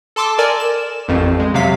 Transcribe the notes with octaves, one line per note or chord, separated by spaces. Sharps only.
A4 A5 C6 D6 E6
A#4 D5 G#5
E7
A1 F2
G#3
C3 F#3 F5 B6